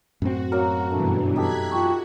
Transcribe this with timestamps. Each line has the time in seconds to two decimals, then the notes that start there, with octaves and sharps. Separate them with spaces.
0.22 F#2 A2 C4 F#4
0.52 F#3 A#3 A#4
0.91 G2 B2 E3 A3 D4
1.36 D#4 G4 A4 F#6 G#6 B6
1.71 F4 F#4 G5 C#6